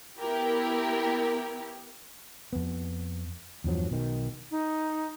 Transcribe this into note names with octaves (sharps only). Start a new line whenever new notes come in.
B3 E4 G4 A#4
F2 B3
E2 G2 F3 F#3
B1 B2 D#3
D#4